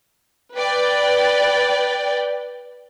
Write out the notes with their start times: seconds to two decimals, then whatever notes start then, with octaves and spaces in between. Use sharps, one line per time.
0.54 B4 D5 G5